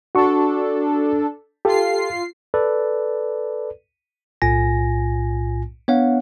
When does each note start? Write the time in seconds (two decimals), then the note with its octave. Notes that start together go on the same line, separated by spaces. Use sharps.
0.15 D4 F#4 A4 C#6
1.65 F4 G4 A4 C7
2.54 A4 B4 D5
4.42 B1 A2 F4 G#5 A#6
5.88 B3 D4 C#5 F5 F#5